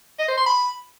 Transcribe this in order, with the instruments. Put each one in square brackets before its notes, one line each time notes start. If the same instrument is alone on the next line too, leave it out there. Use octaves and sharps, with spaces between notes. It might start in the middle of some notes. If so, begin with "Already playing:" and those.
[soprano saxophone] D#5
C5
C6
B5